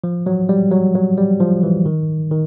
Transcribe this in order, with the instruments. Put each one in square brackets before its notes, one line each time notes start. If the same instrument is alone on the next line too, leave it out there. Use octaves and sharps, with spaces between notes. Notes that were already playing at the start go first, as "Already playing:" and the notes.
[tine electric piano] F3
F#3
G3
F#3
F#3
G3
F3
E3
D#3
D#3